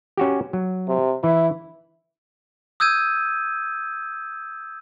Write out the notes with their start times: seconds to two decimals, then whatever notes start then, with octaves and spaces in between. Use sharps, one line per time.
0.18 C#4 F#4 G4
0.53 F#3
0.88 C3
1.24 E3 E4
2.80 D#6 E6 G6 G#6 D#7